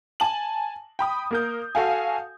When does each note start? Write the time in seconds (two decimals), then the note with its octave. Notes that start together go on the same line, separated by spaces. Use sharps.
0.20 G#5 A5 F#7
0.99 G5 B5 D#6
1.31 A#3 A#4 G6
1.75 F#4 A4 F5 G#5